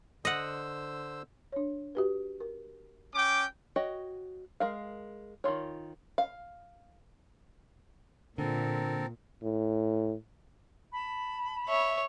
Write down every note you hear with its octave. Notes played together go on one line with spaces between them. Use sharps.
D3 C5 D#5 F#5 E6
D4 C#5
F#4 G4 B4
A#4
C#4 G5 D6
F#4 C#5 D#5 G5
G#3 A#4 F5
D#3 E3 F4 C#5
F5
A#2 D3 C4 A4 A#4
A2
A5 B5
C#5 E5